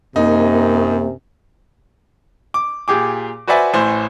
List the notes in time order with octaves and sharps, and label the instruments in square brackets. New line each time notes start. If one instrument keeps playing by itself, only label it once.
[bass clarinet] F#2 [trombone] C3 [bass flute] A#3 [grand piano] D#4
[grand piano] D6
A#2 G4 G#4 D6
F#4 B4 C5 D5 E5 G#5
A1 A2 C5 G#5